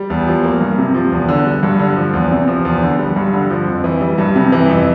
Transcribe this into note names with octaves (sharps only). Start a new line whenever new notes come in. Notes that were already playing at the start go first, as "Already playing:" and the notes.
Already playing: G3
E2
F3
A#3
G2
C3
F3
E2
D3
G3
G2
D3
F3
E2
C3
F3
E2
D3
G3
G2
D3
F3
F2
E3
G3
G2
C3
E3
F2